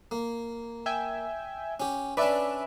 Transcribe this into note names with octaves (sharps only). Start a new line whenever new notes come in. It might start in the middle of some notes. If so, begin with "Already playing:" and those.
A#3
E5 G5 G#5
C#4 G4
C#4 D4 B4 D5 E5